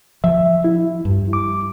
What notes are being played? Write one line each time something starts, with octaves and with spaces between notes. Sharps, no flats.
F3 E5
E4
G2
D6